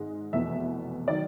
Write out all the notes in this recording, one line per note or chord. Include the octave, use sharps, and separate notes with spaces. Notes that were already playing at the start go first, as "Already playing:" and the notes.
Already playing: G#1 G#2 G#3
F1 E2 B2 E5
D#3 F#3 D5